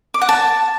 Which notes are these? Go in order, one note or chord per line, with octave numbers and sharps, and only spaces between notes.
D6
F#5
A5